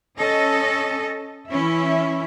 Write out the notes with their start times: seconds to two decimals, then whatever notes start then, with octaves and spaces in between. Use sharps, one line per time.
0.18 C#4 A4 D#5
1.49 E3 C#4 E4 E5